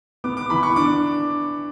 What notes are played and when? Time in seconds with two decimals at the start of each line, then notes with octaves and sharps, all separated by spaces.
0.24 B3 D6
0.37 D6
0.50 E3 B5
0.63 C#6
0.76 D4 D6